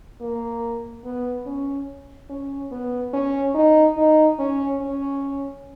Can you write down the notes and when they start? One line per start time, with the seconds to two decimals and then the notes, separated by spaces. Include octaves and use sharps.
0.21 A#3
1.04 B3
1.46 C#4
2.29 C#4
2.72 B3
3.13 C#4
3.55 D#4
3.97 D#4
4.39 C#4
4.81 C#4